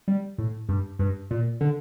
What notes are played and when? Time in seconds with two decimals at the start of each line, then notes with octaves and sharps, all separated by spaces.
0.08 G3
0.38 A2
0.69 G2
0.99 G2
1.31 A#2
1.61 D3